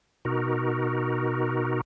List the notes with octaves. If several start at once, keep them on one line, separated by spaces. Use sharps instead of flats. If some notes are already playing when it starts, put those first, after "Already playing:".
B2 D#4 F#4 A#4